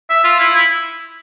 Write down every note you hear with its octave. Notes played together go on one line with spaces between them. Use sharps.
E5
F4
E4
E4